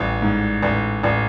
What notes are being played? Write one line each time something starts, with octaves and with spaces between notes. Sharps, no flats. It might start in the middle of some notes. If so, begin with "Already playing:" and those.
Already playing: A1 G3
G#2
A1
A1